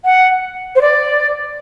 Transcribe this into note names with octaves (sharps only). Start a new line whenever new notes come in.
F#5
C5
D5